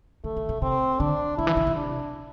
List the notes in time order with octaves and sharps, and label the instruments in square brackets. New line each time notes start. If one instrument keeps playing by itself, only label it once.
[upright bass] D3 [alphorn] A3
[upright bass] D3
C3
[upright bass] C3 [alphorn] C4
[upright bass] D3 [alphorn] D4
[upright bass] D3 [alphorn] E4
[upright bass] E3
D3
C3
[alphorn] D4